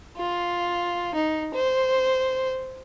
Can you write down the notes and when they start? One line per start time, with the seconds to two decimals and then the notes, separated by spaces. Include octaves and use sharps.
0.17 F4
1.15 D#4
1.54 C5